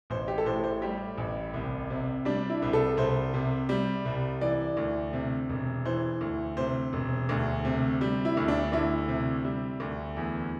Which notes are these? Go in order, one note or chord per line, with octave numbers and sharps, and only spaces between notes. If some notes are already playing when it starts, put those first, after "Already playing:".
A1 C5
G4
A4
A2 C5
C5
G3 G4
A1
C2
C3
G3 D4
E4
C2
A4
C2 C5
C3
G3
C2
E3 D5
D2
C3
E1
E3 C5
D2
C3 C5
E1
D2
C3
G3
E4
D2
D4
D2 E4
C3
G3
D2
E2